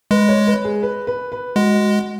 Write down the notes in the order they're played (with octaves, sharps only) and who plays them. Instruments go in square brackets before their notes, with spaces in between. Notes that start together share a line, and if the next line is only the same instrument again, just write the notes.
[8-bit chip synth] G#3 [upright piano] B4
[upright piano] C#5
B4
G#4
B4
B4
B4
[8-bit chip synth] G#3 [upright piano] F#4